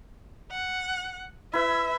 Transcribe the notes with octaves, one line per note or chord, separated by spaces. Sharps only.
F#5
E4 B4 E5